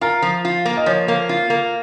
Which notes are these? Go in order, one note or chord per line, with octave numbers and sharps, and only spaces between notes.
F4 A#4
F3
F4
A#3
D#5
F3 C#5
A#3
F4
A#3